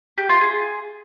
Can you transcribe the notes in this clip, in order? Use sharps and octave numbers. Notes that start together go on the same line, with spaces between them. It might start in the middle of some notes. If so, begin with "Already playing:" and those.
G4
F4
G#4